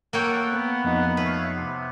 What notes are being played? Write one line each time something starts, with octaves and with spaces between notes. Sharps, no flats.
A#3 A4 C#5 F#5 G5
B3 F#5
F2 D#4
A3 B4 C#5 F5
C3 B3